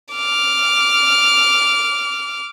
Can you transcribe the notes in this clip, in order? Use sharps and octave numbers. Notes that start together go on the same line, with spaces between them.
D6 F6